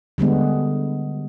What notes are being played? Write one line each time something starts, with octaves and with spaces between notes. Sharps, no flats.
D3 G3 G#3 B3